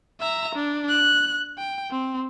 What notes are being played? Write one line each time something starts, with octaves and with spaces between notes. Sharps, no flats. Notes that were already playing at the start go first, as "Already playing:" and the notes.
E5 A#5
D4
F#6
G5
C4